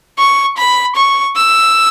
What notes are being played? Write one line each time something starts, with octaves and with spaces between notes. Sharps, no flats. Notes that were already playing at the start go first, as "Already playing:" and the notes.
C#6
B5
C#6
E6